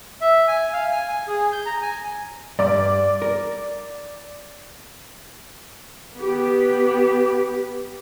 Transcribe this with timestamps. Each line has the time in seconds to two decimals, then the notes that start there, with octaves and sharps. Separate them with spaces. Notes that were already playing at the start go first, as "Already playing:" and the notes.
0.21 E5
0.48 G#5
0.73 F5
0.92 G#5
1.09 G#5
1.28 G#4
1.53 G6
1.66 A#5
1.82 G#5
2.59 G2 D5
3.22 A#4
6.15 B3 G4